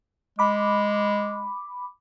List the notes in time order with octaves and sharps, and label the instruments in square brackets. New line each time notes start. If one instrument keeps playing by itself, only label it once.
[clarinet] G#3 [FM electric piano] B5 D6